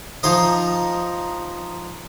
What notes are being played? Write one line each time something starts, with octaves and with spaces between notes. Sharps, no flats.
F3 D#4 C5 D#5